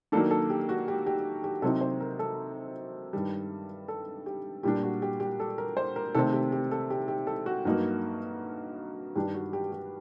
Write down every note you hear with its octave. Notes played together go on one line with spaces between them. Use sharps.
D#3 F#3 A#3 D4 A4
A4
G4
F#4
G4
G4
G4
C3 F#3 C4 D#4 A4
C5
A#4
A4
G2 D#3 G3
A4
G4
A#2 G3 D4 G4
F#4
G4
G4
A4
A#4
C5
A#4
C3 D#3 A3 C4 A4
G4
G4
A4
G4
G4
A4
F#4
G2 F#3 A#3 D#4
G2 D#3 G3 D4 G4
F#4
G4
G4